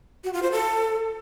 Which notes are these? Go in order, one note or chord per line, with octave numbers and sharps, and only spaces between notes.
F#4
F4
C5
A4